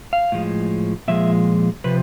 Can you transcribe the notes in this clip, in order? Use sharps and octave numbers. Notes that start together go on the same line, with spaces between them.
F5
A2 F3 G#3
A#2 F3 G#3 E5
C3 F3 B4